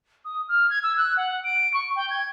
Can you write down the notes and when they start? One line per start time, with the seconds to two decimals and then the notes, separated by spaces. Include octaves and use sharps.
0.25 D#6
0.49 F6
0.70 G#6
0.83 E6
0.97 F#6
1.17 F#5
1.44 D7
1.74 C#6
1.96 G5
2.10 G#6